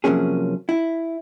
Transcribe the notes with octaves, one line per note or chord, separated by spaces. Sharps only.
C3 F3 F#3 A#3 C#4 G#4
E4